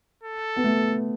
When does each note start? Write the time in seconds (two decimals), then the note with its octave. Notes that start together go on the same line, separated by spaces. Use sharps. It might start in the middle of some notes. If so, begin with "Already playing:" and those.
0.24 A4
0.56 B3
0.64 A3